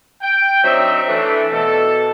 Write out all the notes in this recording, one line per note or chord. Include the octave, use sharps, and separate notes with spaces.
G5
F#3 C4 D4 D#4 E5
E3 A3 D4
B2 A4